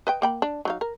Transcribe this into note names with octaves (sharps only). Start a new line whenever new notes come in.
B4 D#5 G5
A#3 G5 B5
D4
F#3 D#4 F5
A#4